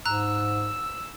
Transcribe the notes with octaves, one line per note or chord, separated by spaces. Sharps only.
G#2 A#5 E6 F#6